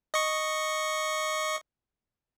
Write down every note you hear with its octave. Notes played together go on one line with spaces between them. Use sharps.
D#5 C#6